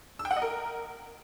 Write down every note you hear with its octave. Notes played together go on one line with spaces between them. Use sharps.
E6
G5
F#5
D#5
A#4